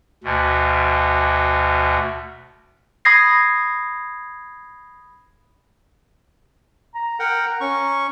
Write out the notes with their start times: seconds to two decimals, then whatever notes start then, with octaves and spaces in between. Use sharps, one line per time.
0.24 D2 B2
3.05 B5 D#6 G#6 A#6 C7
6.95 A#5
7.19 A#4 F#5 G5
7.61 C#4 C#6